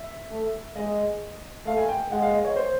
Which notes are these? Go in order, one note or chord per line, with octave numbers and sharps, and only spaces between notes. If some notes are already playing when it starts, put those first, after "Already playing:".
Already playing: E5
A3
G#3 D#5
A3 F5
G#5
G5
G#3 F#5
F5
D#5
C#5
C5